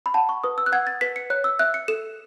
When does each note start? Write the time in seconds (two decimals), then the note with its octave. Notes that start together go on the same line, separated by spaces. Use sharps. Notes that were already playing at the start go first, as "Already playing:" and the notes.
0.06 B5
0.14 F#5 A5
0.29 C#6
0.44 B4 D#6
0.58 E6
0.66 F#6
0.72 F#5 G#6
0.87 A6
1.01 B4 B6
1.16 C#7
1.30 C#5 F#6
1.44 E6
1.59 E5 F#6
1.74 C#7
1.88 A4 E7